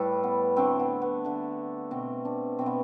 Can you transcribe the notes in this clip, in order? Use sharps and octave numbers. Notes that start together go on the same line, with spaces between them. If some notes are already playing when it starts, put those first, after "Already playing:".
Already playing: A2 G3 A4 B4
B3
D3 A3 C4
B3
B3
D3 A3
B2 A3 C4
D4
B2 A3 C4
B3